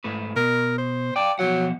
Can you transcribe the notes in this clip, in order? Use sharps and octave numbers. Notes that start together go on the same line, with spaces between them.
G#2 A3 B4
B2 A#4
C5
D5 G5 A5
B2 F3 F#3 F#5